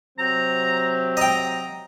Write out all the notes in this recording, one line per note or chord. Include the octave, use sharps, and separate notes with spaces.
C3 F#3 C4 A#5
D#5 G5 A#5